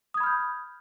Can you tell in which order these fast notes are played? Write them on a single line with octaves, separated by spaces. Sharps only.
D#6 G#6 B5 F6 G6